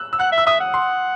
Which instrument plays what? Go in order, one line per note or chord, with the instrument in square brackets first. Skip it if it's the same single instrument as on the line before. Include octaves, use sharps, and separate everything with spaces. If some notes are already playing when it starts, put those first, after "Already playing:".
Already playing: [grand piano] E6 F#6
E6
[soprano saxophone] F#5 [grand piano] F#6
[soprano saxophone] E5
[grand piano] E6
[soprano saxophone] E5 [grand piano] D#6
[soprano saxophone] F#5
[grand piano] C6